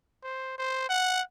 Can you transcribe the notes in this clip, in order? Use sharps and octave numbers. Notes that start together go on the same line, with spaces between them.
C5
C5
F#5